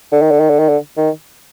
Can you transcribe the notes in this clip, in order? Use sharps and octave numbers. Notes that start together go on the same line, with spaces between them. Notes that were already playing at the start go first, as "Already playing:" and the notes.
D3
D#3
D3
D#3
D3
D#3
D3
D#3